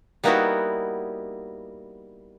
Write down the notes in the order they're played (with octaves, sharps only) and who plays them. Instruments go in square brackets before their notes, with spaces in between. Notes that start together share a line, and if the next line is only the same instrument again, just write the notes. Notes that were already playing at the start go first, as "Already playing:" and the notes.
[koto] G3 A#3 B3 D#4 E4 F#4